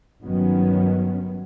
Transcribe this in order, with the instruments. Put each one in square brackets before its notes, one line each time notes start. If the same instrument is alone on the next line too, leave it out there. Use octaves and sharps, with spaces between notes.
[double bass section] G1 G2 D#3 F#3 B3 C#4